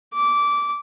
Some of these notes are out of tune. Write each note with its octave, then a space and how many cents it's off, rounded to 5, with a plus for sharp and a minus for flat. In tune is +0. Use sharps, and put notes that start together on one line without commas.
D6 -15